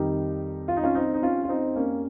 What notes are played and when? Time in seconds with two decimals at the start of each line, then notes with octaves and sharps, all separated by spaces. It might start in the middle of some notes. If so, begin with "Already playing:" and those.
Already playing: F2 D#3 G3 D#4 G4
0.68 F4
0.77 D#4
0.83 C#4 F4
0.95 C4 D#4
1.14 D#4
1.22 C#4 F4
1.44 F4
1.49 C4 D#4
1.76 A#3 C#4